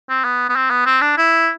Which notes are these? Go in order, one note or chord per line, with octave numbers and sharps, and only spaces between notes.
C4
B3
B3
C4
B3
C4
D4
E4